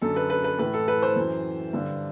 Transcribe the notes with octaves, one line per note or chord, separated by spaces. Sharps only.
F#2 D3 A4
B4
B4
B4
A2 E3 B4
A4
B4
C5
F#2 E3
G2 D3